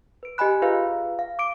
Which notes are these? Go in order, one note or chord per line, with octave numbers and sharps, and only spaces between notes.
B4 D7
G4 D#5 G#5 B5 F#6
F4 G#4 B4 F5
F5
D6 D7